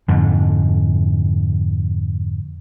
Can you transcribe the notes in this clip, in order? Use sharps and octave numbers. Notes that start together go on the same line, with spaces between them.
F2 G#2 D3